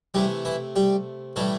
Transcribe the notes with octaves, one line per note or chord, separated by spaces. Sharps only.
C3 E3 G3 A3 G4
E3 E4
G3 G4
A2 E3 G3 A3 A4